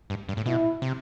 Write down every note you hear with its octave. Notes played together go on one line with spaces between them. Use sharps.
G2
G2
A2
B2 E4
C3